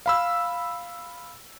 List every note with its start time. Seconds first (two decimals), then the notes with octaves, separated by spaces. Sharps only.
0.06 F5 B5 E6